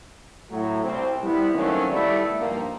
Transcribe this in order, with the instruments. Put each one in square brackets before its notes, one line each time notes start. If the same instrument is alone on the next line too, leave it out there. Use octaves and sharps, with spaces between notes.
[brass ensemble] A2 F#3 A3
C2 C4
G3 B3 C4 E4
D#3 F#3 A3 A#3 C4 C#4
G3 A3 B3 E4 D5 E5
G2 D#3 F3 A#3